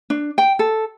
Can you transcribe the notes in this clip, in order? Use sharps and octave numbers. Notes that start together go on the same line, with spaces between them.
D4
G5
A4